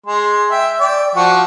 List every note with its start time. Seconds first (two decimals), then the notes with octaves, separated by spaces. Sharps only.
0.06 G#3 C6
0.50 E5 G5
0.80 D5 G5
1.15 F3 F#4 C#6